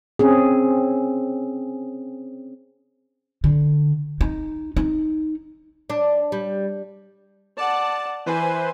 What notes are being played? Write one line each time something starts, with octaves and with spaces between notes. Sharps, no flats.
C4 C#4 G#4
D3
D#4
D#4
D4
G3
D5 F#5 A5
E3 B4 C5 G#5